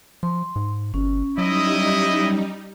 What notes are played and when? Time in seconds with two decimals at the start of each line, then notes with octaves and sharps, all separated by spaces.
0.23 F3 C6
0.56 G#2
0.94 G1 C#4
1.38 F#3 G3 D#4 E4 D#5